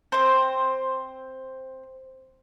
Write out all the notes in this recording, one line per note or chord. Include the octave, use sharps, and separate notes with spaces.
C4 C5